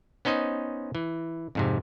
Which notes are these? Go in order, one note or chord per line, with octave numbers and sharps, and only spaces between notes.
B3 C#4 D#4 C5 D#5
E3
F2 G#2 C3